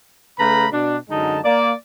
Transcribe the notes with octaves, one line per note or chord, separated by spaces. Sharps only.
C#3 A3 B4 A#5 B5
B2 D4
F#2 D3 G#3 D#4 A5
A#3 D5